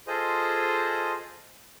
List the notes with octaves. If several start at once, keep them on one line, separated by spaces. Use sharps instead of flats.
F4 G#4 A4 C5 D#5